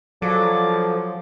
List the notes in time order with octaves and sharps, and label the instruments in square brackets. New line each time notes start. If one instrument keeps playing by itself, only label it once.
[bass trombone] F3 [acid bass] F#3 [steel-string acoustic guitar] G#4 A4 [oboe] D5